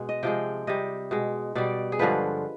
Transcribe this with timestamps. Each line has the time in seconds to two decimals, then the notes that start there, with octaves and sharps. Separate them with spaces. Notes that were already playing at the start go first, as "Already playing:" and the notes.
Already playing: B2 G#3
0.09 D#5
0.23 C3 F3 G#3 G5
0.67 C3 G3 D#5
1.11 B2 G#3
1.55 B2 G3 D5
1.92 G#4
1.99 G2 D3 F3 G#3 B4